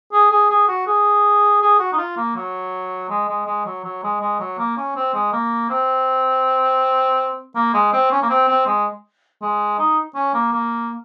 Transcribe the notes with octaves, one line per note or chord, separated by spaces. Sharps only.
G#4
G#4
G#4
F#4
G#4
G#4
F#4
D#4
F4
A#3
F#3
G#3
G#3
G#3
F#3
F#3
G#3
G#3
F#3
A#3
C#4
C4
G#3
A#3
C4
A#3
G#3
C4
C#4
A#3
C4
C4
G#3
G#3
D#4
C#4
A#3
A#3